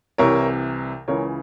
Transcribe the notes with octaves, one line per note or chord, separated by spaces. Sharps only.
C2 C3 E3 A#4 C#5
C#2 C#3 E3 A#4 C#5